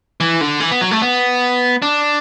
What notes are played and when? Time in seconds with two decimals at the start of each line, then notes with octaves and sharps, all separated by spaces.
0.20 E3
0.41 D3
0.60 E3
0.71 B3
0.81 F#3
0.91 A3
1.02 B3
1.82 D4